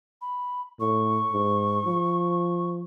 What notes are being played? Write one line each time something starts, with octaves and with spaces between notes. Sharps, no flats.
B5
A2 C#6
G#2
F3